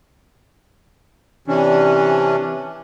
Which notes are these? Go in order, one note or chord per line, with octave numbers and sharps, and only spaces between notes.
C3 E3 C#4 D4